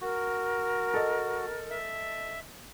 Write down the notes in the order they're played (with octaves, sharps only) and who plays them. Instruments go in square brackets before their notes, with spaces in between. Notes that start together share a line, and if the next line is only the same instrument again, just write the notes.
[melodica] F#4 [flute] A#4
[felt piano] A4 D#5
[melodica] E5